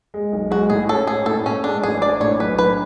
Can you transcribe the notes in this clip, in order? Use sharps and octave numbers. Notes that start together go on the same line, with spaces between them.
G#3
B1
G#3 F#4
A2 G#4
C#4 A4
C#4 G#4
A2 A4
A2 C#4
G#3 D4
A1 G#4
D4 D5
A2 C#5
B1 B4
D4 B4